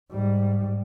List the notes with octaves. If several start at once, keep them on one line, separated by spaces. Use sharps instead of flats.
G#2 G3